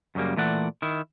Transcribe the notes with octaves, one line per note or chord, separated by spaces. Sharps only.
F#2 C#3 G3 A#3
A#2 E3 A3 D5 F#5
D#3 E4